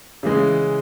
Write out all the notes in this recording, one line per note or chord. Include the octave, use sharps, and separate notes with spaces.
C#3 E3 G#3